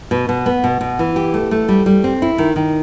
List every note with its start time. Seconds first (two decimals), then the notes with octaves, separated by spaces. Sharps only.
0.11 B2
0.29 B2
0.46 B3
0.64 B2
0.81 B2
0.99 E3
1.16 G4
1.34 A3
1.51 A3
1.69 G3
1.86 G3
2.04 C4
2.22 E4
2.38 D#3
2.56 D#3